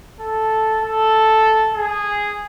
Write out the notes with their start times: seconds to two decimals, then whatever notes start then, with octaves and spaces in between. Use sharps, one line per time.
0.20 A4
0.82 A4
1.74 G#4